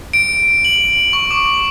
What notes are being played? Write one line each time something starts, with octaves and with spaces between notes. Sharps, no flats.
D7
F#7
C#6
D6